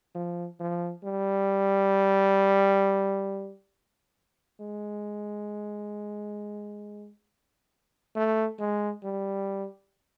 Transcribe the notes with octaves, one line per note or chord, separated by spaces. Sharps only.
F3
F3
G3
G#3
A3
G#3
G3